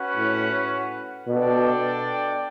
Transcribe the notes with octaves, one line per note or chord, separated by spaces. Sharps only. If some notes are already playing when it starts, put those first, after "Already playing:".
Already playing: C#4 F#4 B4 F#5
A2
B2 D4 A4 D5 G5